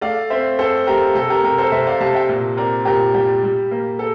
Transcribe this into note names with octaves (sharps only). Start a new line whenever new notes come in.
A3 D5 F5
C4 C5 E5
C4 A4 C5
A3 G4 A#4
C3 A4
G4 A#4
C3 G4 A#4
A4 C5
C3 C5 E5
D5 F5
C3 F5 A5
E5 G5
A#2
C4 A#4 D5
A#2 G4 A#4
G3 G4
G3
A#3
A4